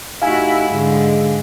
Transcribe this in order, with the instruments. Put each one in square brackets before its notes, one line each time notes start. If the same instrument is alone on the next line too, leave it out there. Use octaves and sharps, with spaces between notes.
[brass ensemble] A2 D#4 G4 [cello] E4 F#4 [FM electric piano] F5 G#5
[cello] G#2 D3 [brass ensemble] G#3